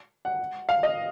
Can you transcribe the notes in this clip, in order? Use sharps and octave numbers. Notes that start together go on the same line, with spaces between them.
F#5
F5
D#5